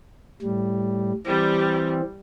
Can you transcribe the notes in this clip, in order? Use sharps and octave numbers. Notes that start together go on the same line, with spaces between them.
A2 G3
E3 G3 C4